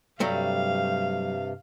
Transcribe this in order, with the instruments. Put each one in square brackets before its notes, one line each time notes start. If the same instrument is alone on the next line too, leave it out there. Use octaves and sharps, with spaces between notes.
[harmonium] G2 C3 [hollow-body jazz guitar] F#3 G3 A3 [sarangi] F5